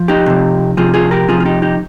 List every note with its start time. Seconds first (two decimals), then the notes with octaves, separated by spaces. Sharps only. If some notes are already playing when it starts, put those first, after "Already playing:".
Already playing: F3
0.08 D#4 G4
0.26 C3 F3
0.77 C3 F3 F4 G#4
0.94 F4 G#4
1.11 G4 A#4
1.28 C3 F3 F4 G#4
1.40 F4
1.45 D#4 G4
1.62 D#4 G4